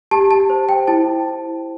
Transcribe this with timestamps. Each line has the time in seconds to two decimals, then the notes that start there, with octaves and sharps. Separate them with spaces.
0.11 G4 A5
0.31 A5
0.50 C5
0.69 G5
0.87 E4 A5